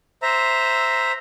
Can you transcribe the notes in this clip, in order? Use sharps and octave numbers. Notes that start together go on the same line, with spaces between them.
C5 E5 A#5